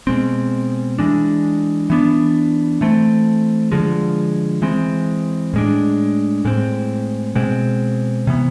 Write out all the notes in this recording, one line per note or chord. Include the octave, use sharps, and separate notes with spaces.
B2 G#3 C4
E3 G#3 D4
E3 B3 D4
E3 A3 C4
D3 F3 G#3
E3 G#3 C4
A2 G#3 D4
A2 G#3 C4
B2 G#3 C4
C3 E3 B3